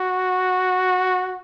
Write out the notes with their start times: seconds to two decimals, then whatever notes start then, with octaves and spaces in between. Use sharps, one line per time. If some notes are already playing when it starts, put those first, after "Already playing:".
Already playing: F#4